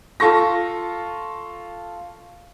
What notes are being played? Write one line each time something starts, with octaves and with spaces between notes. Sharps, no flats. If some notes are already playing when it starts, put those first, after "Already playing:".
F4 A4 C#6 A#6